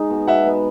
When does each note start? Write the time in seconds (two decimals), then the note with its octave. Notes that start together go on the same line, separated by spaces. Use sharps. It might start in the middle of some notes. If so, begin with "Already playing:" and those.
Already playing: G#3 D#4
0.10 B2
0.28 B2 E5 F#5
0.47 B3